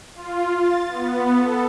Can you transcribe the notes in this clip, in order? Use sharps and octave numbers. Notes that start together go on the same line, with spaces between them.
F4
A6
B3
A4